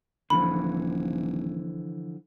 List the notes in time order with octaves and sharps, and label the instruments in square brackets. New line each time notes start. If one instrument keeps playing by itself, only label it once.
[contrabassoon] D#1 [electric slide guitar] D3 E3 F3 [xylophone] B5